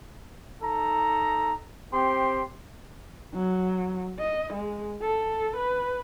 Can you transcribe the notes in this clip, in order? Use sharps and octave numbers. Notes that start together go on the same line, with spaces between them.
D#4 A4 A#5
C4 G4 C6
F#3
D#5
G#3
A4
B4